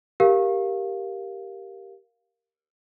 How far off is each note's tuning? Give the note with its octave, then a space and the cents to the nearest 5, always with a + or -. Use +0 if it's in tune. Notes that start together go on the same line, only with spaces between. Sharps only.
G4 +0 A#4 +0 F5 +0